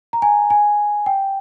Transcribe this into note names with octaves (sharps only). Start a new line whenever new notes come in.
A#5
G#5
G#5
G5